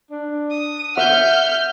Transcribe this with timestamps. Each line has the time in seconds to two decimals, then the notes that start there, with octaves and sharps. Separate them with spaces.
0.11 D4
0.51 D#6
0.97 E5 F#5 F6 G6